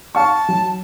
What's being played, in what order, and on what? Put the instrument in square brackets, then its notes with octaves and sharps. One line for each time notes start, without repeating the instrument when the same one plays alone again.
[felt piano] F5 C#6 [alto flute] A5
[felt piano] F#3